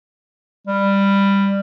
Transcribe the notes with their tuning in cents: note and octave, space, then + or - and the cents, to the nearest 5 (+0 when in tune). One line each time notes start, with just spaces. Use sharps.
G3 +15